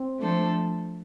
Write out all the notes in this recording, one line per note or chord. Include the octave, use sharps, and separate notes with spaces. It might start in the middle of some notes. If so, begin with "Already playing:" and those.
Already playing: C4
F3 A3 D4 A4 C5